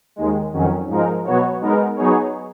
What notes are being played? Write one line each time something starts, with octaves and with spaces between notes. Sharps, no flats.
D#2 D#3 G#3
F2 D#3 F#3 C#4
G#2 F3 G#3 D#4 A#4
B2 F#3 B3 F#4 C#5
G#3 B3 D#4 A#4
F#3 B3 D#4 G#4 C#5